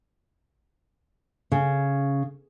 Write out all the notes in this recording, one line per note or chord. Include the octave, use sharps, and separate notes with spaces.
C#3